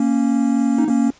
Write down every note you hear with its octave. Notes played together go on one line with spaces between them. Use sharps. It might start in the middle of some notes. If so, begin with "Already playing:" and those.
Already playing: A#3 C#4
D#4
A#3 C#4